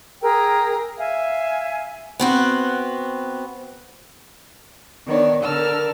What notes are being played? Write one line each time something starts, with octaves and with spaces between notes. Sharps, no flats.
G#4 A#4 G5 E6
E5 F5 G#5
B3 C4 F#4
D#3 B3 D4 C#5 D5
D3 A#4 A5 E6 F6